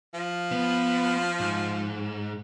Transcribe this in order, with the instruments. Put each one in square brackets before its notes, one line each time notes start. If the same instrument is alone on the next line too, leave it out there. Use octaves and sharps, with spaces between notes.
[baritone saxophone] F3
[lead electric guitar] B3
G#2